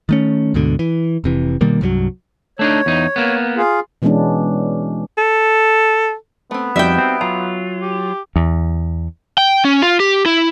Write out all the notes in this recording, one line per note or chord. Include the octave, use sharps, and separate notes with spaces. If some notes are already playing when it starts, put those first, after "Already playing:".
D#3 A3 C#4
D2 G#2 B2 D3
E3
F1 C3 E3
B2 D#3 G3 A#3
C2 G2 E3 F#3
A3 D4 D#4 C#5
E2 D#4
A#3 B3
F4 G#4 F5
B2 E3 G#3 B3 C#4 D4
A4
A3 B3 C4
F2 G3 D#4 F#4 E5 G5
C4
F#3 F4 A#5
G4
E2
G5
C#4
F4
G4
E4